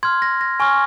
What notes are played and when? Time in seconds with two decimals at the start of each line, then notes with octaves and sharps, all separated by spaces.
0.03 C6 F6 G#6
0.22 A#6
0.41 A#6
0.60 G#5 C#6 F6